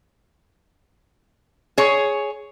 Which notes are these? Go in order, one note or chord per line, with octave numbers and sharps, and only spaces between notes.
G#4 C#5